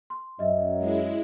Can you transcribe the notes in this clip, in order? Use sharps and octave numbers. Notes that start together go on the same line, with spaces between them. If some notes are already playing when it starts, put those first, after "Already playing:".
C6
F#2 D#5 E5
G#3 E4